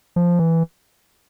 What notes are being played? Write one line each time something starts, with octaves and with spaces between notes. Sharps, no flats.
F3
E3